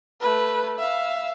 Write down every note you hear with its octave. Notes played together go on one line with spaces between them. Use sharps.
A3 B4
E5 F5